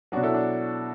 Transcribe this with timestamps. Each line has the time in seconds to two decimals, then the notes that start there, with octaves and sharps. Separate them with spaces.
0.12 F#3 D4 F#4
0.16 B2
0.23 E4 A4
0.34 D4